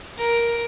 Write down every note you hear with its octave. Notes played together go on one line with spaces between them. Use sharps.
A#4